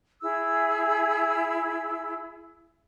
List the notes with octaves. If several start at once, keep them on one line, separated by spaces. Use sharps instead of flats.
E4 G#4 E6